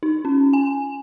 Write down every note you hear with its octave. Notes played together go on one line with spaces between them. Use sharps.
D#4
C#4
G#5